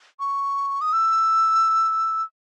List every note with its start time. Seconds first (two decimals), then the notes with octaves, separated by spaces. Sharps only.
0.20 C#6
0.81 D#6
0.93 E6